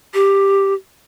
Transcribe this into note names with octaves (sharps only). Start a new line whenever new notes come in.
G4